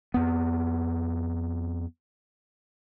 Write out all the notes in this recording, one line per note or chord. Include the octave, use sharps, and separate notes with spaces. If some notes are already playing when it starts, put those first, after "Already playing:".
F2 B3